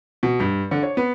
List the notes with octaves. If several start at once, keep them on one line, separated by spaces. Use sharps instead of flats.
B2
G2
D3
C#5
B3